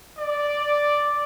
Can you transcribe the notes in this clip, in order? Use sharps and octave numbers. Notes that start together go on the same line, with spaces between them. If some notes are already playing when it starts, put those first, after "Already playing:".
D5